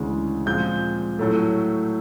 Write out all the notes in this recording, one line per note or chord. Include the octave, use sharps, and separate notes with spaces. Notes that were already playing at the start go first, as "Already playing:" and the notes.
Already playing: D2 C#3 E3 G#3
A#2 F3 G#3 C4 G6
A2 F#3 A3